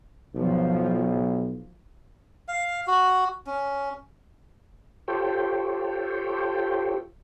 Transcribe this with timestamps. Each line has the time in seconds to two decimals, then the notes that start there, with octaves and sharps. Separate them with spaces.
0.36 B1 F3
2.48 F5
2.87 F#4
3.47 C#4
5.08 F4 G4 A4 C5 C#5 G5